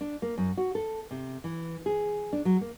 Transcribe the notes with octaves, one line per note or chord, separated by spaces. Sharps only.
D4
A#3
F#2
F#4
A4
C3
E3
G#4
D4
F#3
A#3